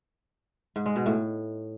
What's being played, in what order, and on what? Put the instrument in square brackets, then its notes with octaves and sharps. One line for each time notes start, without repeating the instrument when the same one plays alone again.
[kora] G#2
G#3
B2
A2